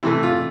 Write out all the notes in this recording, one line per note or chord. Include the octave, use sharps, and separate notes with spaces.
C3 E3 A3 E4
F4